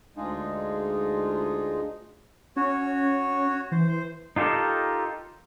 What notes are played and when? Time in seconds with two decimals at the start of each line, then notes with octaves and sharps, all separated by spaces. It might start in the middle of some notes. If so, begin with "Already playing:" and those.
0.17 D2 G#3 D4 D#4 F4 G#4
2.56 C#4 F#4 C#5
3.72 E3 C5
3.88 C5
4.36 D#4 F4 G4 A4 A#4